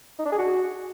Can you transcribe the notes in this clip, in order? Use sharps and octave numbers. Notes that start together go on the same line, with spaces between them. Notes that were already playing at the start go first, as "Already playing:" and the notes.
D#4
D4
G#4
F#4